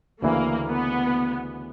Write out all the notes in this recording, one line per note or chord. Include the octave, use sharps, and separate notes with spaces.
D2 C#3 E3 A#3
B3